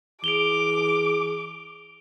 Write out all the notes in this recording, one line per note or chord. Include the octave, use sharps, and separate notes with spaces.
E3 G#4 D6 D7 F7 G7